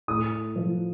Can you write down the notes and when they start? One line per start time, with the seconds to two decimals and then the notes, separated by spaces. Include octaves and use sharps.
0.08 A2 D#6
0.56 F3